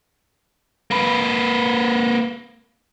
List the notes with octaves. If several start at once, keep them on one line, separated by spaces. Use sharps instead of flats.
A#3 B4